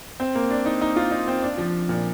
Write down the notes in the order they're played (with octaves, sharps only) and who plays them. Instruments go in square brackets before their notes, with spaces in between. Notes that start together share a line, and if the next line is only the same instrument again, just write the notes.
[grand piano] C4
A#3
D4
D#4
D#4
F4
D#4
C4
D4
F3
A#2